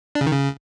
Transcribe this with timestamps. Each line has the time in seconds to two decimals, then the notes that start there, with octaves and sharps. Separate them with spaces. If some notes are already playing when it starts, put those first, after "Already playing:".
0.15 D4
0.21 C#3
0.27 D#3
0.32 C#3